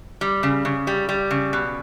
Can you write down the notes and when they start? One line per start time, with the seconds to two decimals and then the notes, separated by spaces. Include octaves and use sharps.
0.21 G3
0.43 C#3
0.65 C#3
0.87 G3
1.09 G3
1.31 C#3
1.53 B2